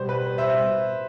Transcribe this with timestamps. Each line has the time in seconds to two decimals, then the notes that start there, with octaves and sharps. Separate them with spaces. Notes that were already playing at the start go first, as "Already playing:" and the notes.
Already playing: B2 G3 B3 C5
0.09 B4
0.26 C5
0.38 C5 E5